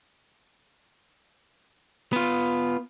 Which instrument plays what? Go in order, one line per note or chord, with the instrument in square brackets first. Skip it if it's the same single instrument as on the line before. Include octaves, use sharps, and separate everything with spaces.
[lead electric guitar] B3 F4